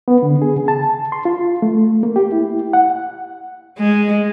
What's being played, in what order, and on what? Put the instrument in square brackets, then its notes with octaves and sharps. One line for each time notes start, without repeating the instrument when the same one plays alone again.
[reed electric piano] B3
D3
G#4
C#3
A5
C6
F4
A3
A#3
G4
E4
F#5
[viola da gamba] G#3